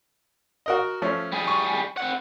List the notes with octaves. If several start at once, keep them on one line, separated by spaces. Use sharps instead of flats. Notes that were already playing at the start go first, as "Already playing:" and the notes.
F#4 A#4 D#5
F3 A3 C#4
G3 G#4
C#6
C4 F#5